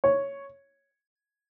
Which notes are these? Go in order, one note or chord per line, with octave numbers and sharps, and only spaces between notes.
C#5